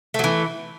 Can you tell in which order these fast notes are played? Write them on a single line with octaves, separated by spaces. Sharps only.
A3 F#3 E3